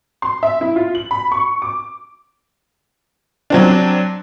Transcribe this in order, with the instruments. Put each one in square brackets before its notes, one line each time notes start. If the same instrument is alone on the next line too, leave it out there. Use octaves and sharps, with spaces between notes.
[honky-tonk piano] C6
E5
E4
F4
F#7
B5
C#6
D6
F#3 C4 D4